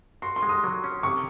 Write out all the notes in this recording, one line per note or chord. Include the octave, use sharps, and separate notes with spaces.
F#4 C6
C6
G#3
D#6
F#3
C#4
C3 C#6